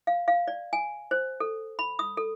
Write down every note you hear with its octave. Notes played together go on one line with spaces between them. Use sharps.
F5
F5
D5
G#5
C5
A4
B5
D#6
A4